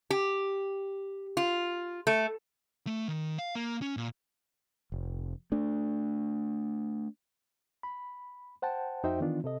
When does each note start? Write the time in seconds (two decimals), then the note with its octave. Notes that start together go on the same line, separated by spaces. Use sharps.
0.10 G4
1.37 F4
2.07 A3
2.87 A3
3.08 D#3
3.38 F5
3.55 A#3
3.82 C#4
3.97 A#2
4.92 F1
5.52 A3 D4
7.83 B5
8.62 C5 F#5 G5 A5
9.04 F2 D#4 F#4 C5 E5 G5
9.21 D#3 E3 B3 D4 F4
9.44 C3 A4 D#5